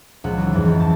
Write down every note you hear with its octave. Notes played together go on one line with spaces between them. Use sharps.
C#2 A#2 F3 F#5 E6
E3 F#3 D#4
F2 G#2 E3 F3
C#2 C4
A5